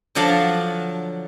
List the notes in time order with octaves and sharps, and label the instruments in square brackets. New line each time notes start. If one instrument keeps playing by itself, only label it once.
[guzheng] D3 F3 F#3 D4 F5 A5